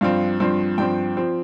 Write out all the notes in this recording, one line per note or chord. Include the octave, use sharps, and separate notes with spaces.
G2 F3 C4 F5
G2 F3 C4
G2 F3 C4 G5
F3 C4